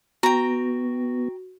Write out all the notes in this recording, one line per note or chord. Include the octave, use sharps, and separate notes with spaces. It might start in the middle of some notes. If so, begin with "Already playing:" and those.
B3 F#4 G5 A#5